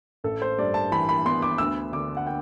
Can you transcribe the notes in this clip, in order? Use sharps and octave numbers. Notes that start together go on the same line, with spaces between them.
A1 A4
C5
G2 D5
A5
E3 B5
B5
B3 C6
D6
D2 E6
D3 D6
F#5
G5